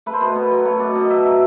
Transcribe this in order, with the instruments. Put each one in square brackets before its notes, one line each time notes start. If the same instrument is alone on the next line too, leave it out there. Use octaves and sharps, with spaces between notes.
[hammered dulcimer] A3 B4
C5
B2 B4
B2
F#3
A3 C#5
B2 D5
B2 D#5
F#3 E5
F#3 E5